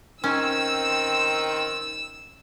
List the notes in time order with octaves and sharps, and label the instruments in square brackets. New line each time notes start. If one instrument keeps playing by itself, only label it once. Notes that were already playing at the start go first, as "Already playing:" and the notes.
[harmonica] D#3 [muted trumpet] C4 [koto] C#4 [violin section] E6